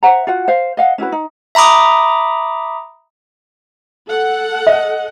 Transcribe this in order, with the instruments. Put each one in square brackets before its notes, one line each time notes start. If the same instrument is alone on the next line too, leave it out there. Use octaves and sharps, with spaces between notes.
[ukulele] C5 E5 F#5 A#5
F4 F#4 F#5
C5 F5
D#5 F5 F#5
C#4 E4 F#4 B4
D#4
[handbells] E5 A#5 B5 D6 D#6
[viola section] A4 F#5
[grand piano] D#5